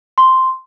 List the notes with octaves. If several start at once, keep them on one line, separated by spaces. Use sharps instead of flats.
C6